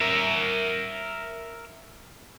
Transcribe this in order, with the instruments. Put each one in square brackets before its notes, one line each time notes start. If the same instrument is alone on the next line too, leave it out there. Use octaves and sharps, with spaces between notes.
[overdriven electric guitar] A#4 E5